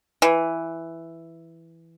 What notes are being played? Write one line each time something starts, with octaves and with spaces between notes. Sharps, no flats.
E3